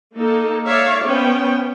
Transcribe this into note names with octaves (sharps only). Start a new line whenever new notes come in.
A#3 D#4 A4
C#5 D5 E5 F5
B3 C#4 C5 G5